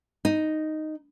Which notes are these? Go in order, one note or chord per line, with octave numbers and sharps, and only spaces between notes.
D#4